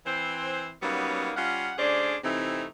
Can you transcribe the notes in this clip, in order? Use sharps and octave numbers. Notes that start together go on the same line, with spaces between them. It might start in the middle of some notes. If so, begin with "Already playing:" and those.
E3 C4 C5
F#3 G3 A#3 B3 C#4 D#4
G3 C#4 F4 F5 F#5
D2 C#4 D4 G#4 C5 D5
C3 E3 A3 C4 D#4 E4